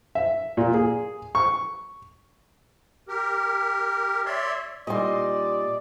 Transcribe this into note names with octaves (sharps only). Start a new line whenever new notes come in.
E5
A#2
G#4
C#6
G4 A#4
C#5 D5 E5 C6
A#2 G3 D#4 D5 D#5 C6